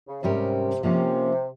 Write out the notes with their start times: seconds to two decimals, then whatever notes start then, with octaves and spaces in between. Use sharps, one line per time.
0.08 C#3
0.22 G#2 C3 G3 C#4 G4 A#4
0.83 C3 F3 A#3 C#4